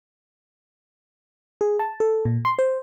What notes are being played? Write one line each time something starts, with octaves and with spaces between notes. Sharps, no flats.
G#4
A5
A4
A#2
C6
C5